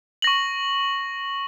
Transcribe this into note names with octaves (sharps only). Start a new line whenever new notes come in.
C#6 A#6 F#7